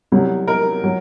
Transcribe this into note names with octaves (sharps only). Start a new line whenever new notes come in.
C2 C3 F#3
A#4
F#3